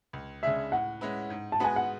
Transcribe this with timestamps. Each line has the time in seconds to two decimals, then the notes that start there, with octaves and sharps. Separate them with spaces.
0.13 C#2
0.43 C#3 G#3 D4 G#4 E5
0.72 A2 F#5
1.01 G#3 C#4 E4 B4
1.30 G#2
1.52 A5
1.60 G#3 B3 F#4 B4 G#5
1.76 F#5